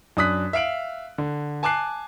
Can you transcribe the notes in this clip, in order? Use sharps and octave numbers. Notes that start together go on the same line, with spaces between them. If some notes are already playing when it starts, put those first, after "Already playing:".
F#2 D4 D#6 F#6 B6
E5 F5 D7 F#7
D3
G#5 A5 D6 F#6 C7